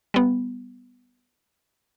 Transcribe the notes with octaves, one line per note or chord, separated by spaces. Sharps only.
G3 B3